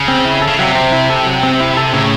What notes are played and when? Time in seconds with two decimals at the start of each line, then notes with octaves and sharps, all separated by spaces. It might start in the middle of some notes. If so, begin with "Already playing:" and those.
Already playing: C#3
0.08 C4
0.25 E4
0.42 A4
0.48 C#3
0.59 C3 F#3
0.75 C4
0.92 E4
1.10 A4
1.25 F#3
1.43 C4
1.60 E4
1.77 A4
1.93 A2 C#3